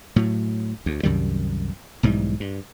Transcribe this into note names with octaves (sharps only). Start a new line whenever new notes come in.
A2 F#3
D2
C2 F#2 D#3 G3
B1 G#2 E3 G3
G2